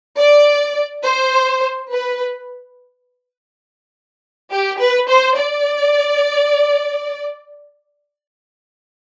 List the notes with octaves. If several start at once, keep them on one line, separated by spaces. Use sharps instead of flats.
D5
C5
B4
G4
B4
C5
D5